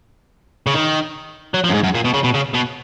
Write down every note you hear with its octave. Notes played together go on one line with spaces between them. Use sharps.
C#3
D#3
F#3
F3
F#2
G#2
F#2
A#2
B2
C#3
B2
C#3
B2